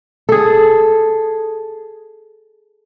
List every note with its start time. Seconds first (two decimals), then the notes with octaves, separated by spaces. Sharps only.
0.29 G#4 A4